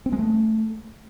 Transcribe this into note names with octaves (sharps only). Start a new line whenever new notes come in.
C4
G#3
A3